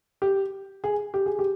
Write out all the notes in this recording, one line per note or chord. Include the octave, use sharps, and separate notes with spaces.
G4
G#4
G4
G#4
G4